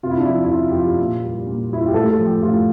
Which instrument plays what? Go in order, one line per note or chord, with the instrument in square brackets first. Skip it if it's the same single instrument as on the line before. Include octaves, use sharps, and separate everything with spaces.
[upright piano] C3 F4
E4
D4
F3 E4
E4
C3 F4
G4
F3 F4
A#2
G3
A#2
G3 E4
F4
G4
A2 A4
A4
F3
G4
A2 F4